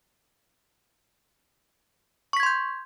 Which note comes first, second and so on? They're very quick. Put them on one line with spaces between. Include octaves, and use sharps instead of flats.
C#6 B6 G#6 C6 G6